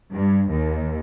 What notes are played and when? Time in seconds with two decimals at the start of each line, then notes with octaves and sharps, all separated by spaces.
0.11 G2
0.52 D#2